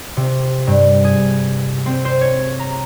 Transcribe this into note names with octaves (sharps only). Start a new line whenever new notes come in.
C3
G2
G#4
C4
C5
C#5
A#5